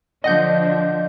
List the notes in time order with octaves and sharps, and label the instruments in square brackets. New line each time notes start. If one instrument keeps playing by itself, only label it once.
[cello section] D3 F3 D4 [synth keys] D#5 F#5 G6